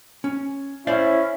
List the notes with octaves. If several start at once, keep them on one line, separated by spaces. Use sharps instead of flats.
C#4
C#4 E4 C5 D5 F5